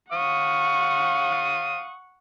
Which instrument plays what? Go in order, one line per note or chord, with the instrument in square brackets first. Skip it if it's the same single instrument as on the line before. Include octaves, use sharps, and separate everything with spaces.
[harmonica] F5 D#6 [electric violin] F#5 C#6